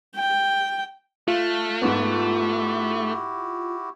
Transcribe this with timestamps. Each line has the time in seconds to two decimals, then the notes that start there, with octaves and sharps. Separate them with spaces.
0.16 G5
1.28 A3 F4 F5 F6 F#6
1.82 G#2 B3 E4 F#4 G4